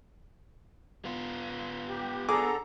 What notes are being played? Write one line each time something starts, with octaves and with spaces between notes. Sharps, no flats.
B3 F4
G4
D3 G#4 A4 A#5 D6